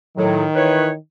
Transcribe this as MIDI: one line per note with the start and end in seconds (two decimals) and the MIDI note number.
0.17 0.43 45
0.17 0.95 51
0.17 0.43 54
0.56 0.89 52
0.56 0.89 71
0.56 0.89 73